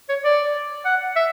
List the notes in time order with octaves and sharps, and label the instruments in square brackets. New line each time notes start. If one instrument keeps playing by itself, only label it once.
[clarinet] C#5
D5
F#5
E5